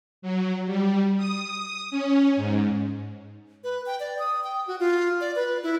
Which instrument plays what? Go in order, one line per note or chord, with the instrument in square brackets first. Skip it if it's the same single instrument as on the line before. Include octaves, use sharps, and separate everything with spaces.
[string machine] F#3
G3
D#6
C#4
G#2
[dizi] B4
G5
D5
D#6
G5
F#4
F4
D5
B4
E4